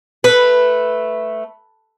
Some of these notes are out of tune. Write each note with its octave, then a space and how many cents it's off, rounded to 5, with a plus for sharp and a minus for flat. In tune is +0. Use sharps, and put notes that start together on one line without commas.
A3 +0 B4 +0